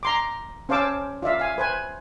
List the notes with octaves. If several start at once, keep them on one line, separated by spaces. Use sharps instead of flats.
A#5 C6 D6
C#4 C5 F5 A5 D6 E6
F4 D5 E5 F5
F5 G#5
B4 C5 G#5